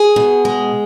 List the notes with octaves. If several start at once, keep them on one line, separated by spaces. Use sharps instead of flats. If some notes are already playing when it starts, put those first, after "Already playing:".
Already playing: G#4
B2
G#3